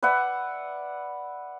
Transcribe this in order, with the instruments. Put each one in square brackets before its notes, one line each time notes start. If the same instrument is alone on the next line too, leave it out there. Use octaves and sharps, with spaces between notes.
[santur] B4 D5 E5 F#5